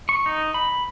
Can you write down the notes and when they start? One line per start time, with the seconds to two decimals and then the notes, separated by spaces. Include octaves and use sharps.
0.09 C#6
0.26 D#4
0.54 B5